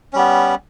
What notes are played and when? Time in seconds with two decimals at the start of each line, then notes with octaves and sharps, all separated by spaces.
0.13 C#4
0.16 G3
0.18 B3